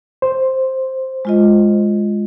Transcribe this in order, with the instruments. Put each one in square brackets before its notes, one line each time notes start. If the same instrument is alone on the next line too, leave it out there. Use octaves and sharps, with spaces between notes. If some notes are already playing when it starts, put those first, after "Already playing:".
[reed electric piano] C5
[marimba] G#3 F4 D#5